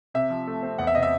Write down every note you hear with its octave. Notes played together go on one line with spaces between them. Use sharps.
C3 E5
F3
A3
C4
E2 F#5
E5
C3 D#5
E5